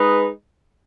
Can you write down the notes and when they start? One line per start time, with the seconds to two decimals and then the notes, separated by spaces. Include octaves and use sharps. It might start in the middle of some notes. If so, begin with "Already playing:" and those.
Already playing: G#3 D#4 G#4 B4